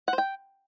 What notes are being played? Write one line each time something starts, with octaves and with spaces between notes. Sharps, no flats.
F#5
C5
G5